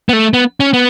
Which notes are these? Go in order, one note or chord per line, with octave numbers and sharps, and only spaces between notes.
B3
A3
B3
C#4
B3